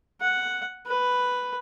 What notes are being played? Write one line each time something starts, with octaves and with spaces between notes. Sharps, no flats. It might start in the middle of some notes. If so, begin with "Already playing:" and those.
F#5
B4